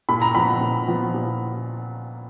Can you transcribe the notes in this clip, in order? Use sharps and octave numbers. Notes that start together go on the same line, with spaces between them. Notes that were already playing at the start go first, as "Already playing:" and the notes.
A#2 B5
A#5
F3 B3 B5
A#2
F3 B3
A#2